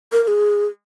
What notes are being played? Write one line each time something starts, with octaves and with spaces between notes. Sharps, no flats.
A#4
A#4
G#4